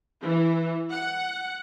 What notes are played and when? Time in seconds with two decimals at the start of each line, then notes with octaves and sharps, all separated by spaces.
0.23 E3
0.92 F#5